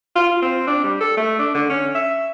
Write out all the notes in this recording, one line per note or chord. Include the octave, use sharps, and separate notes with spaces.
F4
C4
D4
G3
A4
A3
D4
D3
C#4
E5